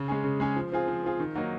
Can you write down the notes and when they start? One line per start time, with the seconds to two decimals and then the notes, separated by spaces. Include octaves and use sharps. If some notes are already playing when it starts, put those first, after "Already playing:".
Already playing: C#3
0.08 G#3 C#4 G#4
0.24 C#3
0.40 G#3 C#4 G#4
0.56 F3
0.72 C4 F4 G#4
0.88 F3
1.04 C4 F4 G#4
1.20 D#3
1.35 F#3 A#3 D#4